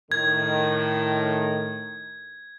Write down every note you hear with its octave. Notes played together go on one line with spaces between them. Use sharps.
A2 D#3 G#6